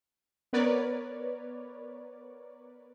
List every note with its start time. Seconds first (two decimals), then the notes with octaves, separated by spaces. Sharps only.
0.53 B3 A#4 B4 C#5 D5